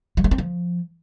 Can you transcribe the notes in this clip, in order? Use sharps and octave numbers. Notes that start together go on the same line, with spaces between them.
F#3
G#3
C4
F3